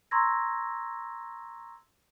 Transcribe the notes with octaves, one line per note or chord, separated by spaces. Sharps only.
A#5 C6 C#6 E6 G#6 A#6